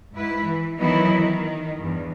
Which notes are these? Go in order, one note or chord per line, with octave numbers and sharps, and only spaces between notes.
G#2 E4 B4
E3
D#3 E3 F#3 B3 D#4 E4
D#3
E2 G2